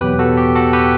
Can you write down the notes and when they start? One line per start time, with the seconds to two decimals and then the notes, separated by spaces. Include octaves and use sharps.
0.01 E2 B2 F#3 B3 G4 B4
0.19 F#4 A4
0.37 G4
0.55 F#4 A4
0.73 G4 B4